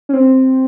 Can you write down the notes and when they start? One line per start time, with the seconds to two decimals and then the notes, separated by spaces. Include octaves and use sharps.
0.09 C#4
0.13 C4